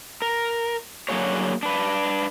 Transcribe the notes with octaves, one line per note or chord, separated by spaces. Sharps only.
A#4
D3 F#3 A#3 F#4 G#4 C#5
D4 B4